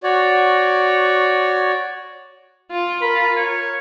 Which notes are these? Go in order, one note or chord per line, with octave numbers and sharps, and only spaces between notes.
F#4 C#5 D5
F4
A#4 B5
C#5